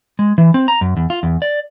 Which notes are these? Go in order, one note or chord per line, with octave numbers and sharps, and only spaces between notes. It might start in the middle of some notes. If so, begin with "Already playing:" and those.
G#3
E3
C4
A#5
F#2
E2
F4
E2
D5